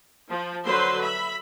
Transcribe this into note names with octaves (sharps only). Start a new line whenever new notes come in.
F3
D3 F#3 B4 C5 C6
E5 B5